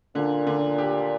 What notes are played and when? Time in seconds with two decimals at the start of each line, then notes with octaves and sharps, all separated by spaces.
0.15 A#2 D3
0.47 D3
0.78 G4